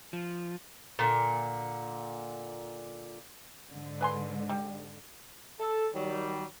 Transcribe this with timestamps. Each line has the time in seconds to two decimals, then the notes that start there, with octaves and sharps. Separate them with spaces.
0.13 F3
0.99 A#2 D3
3.70 G#2 D3
4.01 B4 G#5 C6
4.49 G3
5.60 A4
5.94 D#3 F#3 G3